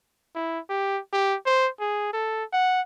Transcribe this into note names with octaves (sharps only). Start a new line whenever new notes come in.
E4
G4
G4
C5
G#4
A4
F#5